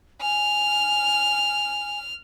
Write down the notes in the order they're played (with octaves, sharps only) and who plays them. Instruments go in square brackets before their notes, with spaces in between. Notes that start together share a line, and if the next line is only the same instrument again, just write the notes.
[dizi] G#5 [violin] F6